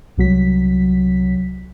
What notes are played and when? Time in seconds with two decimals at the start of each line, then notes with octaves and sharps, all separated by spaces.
0.18 C2 F#3 B6